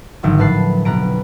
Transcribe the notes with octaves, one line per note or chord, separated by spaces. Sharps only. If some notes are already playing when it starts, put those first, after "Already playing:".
G#1 D3 F3 F#3
A2 B4 A5 C7
F1 B2 B4 A#5 D7